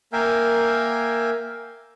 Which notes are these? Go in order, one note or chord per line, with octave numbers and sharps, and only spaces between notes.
A#3 A#4 E5 F5 G5 G#5